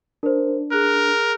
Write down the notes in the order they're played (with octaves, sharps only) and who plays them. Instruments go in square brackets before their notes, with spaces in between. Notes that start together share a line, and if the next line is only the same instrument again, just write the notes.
[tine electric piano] D4 [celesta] A#4 C5
[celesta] G#4 F#6 [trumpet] A#4